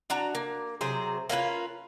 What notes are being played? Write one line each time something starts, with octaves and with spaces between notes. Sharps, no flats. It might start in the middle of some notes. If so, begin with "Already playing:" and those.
D4 F#4 A#5
A#3
C3 F#3 G#4 C5
A#3 C#4 F4 B4